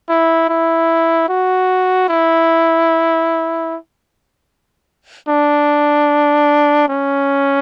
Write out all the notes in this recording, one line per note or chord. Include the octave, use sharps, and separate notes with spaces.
E4
E4
F#4
E4
D4
C#4